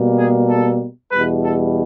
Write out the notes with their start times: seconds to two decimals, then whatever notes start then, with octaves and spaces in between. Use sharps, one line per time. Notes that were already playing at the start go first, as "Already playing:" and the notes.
Already playing: B2 G3 A#3
0.18 G#4
0.49 A4
1.11 E2 B2 G3 B4
1.43 A4